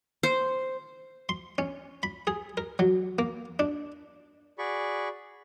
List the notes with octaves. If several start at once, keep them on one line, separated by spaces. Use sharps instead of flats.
C5
C6
C#4
B5
G#4
A#4
F#3
A#3
D4
F#4 G#4 D5 B5 C#6